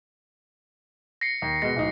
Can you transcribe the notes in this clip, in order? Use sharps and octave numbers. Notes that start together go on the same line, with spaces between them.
A#6 C7 C#7
D#2
B2 G#3 A#6
D1 D#4